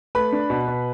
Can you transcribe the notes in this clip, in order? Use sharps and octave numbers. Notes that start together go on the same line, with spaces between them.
A3 B4 B5
D4
B2
B2